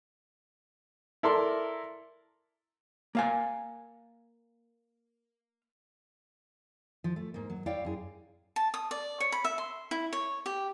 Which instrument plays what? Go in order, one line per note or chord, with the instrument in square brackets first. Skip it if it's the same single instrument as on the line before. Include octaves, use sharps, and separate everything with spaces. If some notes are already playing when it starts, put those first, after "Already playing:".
[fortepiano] E4 A4 A#4 D5 C6
[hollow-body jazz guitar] A#3 F5 G#5
[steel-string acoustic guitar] F3
A3
G#2 A#3
F#3
E4 C#5 D5 F5 G5
F#2 G#4
[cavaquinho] A5
D#6
D5
C#5
B5
E5
C6
E4
C#5
G4